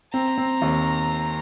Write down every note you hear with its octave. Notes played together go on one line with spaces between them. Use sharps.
C4 A#5
C4
D#2